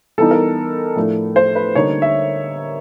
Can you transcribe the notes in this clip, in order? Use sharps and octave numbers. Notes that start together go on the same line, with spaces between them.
E3 G3 B3 D#4 A4
A#4
A2 F3 A3 D4
C5
B4
D3 G3 A#3 D#4 C#5
E5